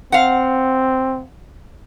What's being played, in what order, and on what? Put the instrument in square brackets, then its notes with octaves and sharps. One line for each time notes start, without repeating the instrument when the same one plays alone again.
[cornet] C4 [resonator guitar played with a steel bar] F5 F#5